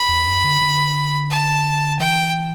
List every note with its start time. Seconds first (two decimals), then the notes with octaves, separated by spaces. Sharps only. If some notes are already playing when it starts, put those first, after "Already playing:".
Already playing: B5
0.09 E2
0.27 F#2
0.44 D3
0.62 D3
1.30 A5
1.99 E3 G5